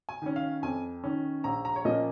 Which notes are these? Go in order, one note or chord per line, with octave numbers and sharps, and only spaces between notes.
G#5
D#3 C#4
F5
F2 G#5
D#3 C#4
A#1 A#5
A#5
C#5
A#2 F3 A#3 C#4 D#5